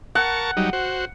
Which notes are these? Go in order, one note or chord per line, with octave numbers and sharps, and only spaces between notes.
A#4 F#5 A5 C#6
F#3 G3 D#4
F#4 C5